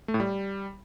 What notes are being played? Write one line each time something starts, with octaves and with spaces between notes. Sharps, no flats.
A3
A2
G3